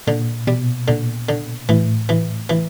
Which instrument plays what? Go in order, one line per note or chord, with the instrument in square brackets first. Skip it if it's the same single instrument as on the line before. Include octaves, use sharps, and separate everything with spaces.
[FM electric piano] A#2 [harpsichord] D3
[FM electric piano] B2 [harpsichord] G3
[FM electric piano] A#2 [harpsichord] D3
[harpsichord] D3
[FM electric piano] A2 [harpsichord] E3
[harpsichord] E3
E3